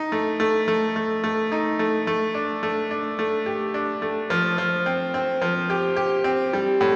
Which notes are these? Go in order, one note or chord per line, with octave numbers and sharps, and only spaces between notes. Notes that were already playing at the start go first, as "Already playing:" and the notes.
Already playing: D#4
A3
A3
A3
A3
A3
D#4
A3
A3
D4
A3
D4
A3
G4
D4
A3
F3
F3
C4
C4
F3
G4
G4
C4
G3
A2